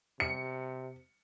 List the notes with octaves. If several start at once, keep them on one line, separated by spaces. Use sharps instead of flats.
C3 C#7